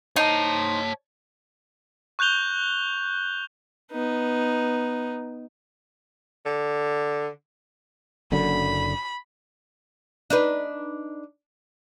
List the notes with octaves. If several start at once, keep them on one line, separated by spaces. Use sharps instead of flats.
D#4 C5 C#5 A5
C#6 F#6 G6 F7 G7
B3 D#4
D3
F#1 F#2 D3 B5
D4 D#4 B4